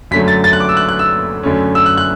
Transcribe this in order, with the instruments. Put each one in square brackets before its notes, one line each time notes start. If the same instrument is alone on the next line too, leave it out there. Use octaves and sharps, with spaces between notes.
[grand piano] F#2 D3 F#3 A3 B6
A6
A6
F#6
D6
E6
F#6
F#6
E6
F#2 D3 A3 C#4
E6
F#6
F#6